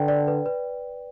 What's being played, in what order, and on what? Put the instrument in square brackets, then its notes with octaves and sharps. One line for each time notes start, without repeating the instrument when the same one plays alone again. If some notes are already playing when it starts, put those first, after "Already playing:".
Already playing: [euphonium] D3 [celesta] B4 G5
[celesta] D5
B4
B4